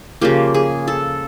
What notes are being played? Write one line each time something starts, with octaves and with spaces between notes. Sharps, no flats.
C#3 F3 A#3 G4
G#4
A4